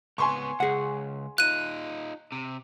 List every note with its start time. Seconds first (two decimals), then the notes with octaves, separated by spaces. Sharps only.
0.18 C#2 B3 G#5 C6 C#6
0.60 C#2 G#4 F#5
1.38 D#4 F4 F#6 D#7
2.32 C3